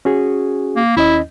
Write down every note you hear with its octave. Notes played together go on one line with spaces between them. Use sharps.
C#4 F#4 G#4
A#3
D#2 C#4 E4 D#5